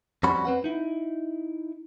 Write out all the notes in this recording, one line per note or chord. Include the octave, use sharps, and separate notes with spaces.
F2 G3 C#4 F#4 B5
C4 B4 F#5
D#4 E4